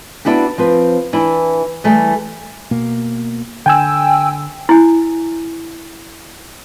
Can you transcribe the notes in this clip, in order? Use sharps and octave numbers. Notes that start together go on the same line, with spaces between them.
B3 D4 E4 F#4 G4
F3 C4 B4
E3 D4 E4
E3 G3 A3
B2 A#3
D3 G5 G#5 E6
E4 G#5